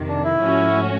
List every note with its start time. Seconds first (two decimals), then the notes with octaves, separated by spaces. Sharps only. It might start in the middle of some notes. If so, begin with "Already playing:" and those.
Already playing: F2 C3 D#3
0.09 D4
0.24 E4
0.39 G#2 F3 A3 C#4 F#4